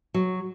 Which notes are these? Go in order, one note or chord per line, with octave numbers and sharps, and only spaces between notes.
F#3